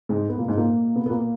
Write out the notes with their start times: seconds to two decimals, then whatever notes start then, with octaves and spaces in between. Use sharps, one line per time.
0.09 G#2 G#3
0.29 B3
0.38 A#2 A#3
0.48 G#2 G#3
0.57 A#2 A#3
0.95 B2 B3
1.06 B3
1.10 A#2 A#3